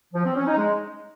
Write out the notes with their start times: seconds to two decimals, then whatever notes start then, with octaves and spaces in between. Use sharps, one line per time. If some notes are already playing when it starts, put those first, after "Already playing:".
0.14 F3
0.25 C4
0.36 C#4
0.46 D#4
0.57 G#3